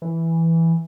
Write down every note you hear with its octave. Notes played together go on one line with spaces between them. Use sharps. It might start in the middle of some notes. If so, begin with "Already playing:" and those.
E3